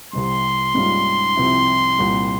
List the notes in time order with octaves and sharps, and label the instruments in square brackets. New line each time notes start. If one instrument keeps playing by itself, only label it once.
[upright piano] C2 C3 G3 [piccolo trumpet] C6
[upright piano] G#2 G3 A#3 C#4 F4
C2 C3 F3 C4 E4
C2 A#2 G3